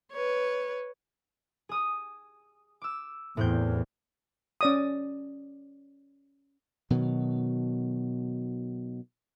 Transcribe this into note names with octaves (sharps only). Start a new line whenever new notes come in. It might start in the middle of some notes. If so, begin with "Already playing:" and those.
B4 C#5
G#4 D#6
D6 E6
E2 A2 C4 G6
C#4 D5 D#6
B2 D#3 F#3